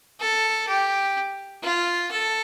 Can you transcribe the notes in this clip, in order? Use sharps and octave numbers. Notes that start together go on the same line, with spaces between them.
A4
G4
F4
A4